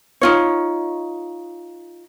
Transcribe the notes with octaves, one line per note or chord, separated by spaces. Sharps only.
D#4 F4 C#5